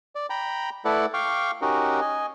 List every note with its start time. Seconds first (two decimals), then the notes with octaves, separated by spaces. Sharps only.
0.15 D5
0.30 G5 A#5 B5
0.85 A3 E4 A4 B4 D5 F#5
1.14 F5 G5 C#6 D6 F6
1.62 C#4 D#4 F#4 G4 A#4
2.01 D#5 G#5